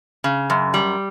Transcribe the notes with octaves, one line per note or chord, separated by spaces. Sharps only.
C#3
F#2
G3